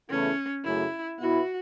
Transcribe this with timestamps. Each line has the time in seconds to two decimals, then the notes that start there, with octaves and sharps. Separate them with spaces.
0.10 E2 C#3 A3 C#4 E4
0.64 F#2 C#3 A3 E4
1.20 B2 B3 E4 F#4